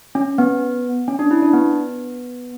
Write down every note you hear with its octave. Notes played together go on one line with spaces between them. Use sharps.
C#4
B3
C#4
D4
E4
D4
B3